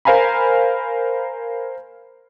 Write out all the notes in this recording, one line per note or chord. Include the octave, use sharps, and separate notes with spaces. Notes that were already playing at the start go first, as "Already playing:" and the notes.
A#4 C5 F5 G#5 A#5 B5